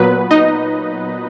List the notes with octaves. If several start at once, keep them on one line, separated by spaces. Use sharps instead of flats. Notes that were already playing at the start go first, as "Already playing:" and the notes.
Already playing: A#2 F#3 B3 B4
D#4 D#5